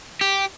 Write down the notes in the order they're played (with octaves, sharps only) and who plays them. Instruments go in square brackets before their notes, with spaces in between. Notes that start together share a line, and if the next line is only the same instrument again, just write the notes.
[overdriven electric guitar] G4